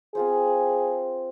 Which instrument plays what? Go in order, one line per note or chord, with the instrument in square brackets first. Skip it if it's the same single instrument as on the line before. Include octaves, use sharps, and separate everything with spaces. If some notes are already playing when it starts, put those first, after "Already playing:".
[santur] C4 F4 C5 [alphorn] G#4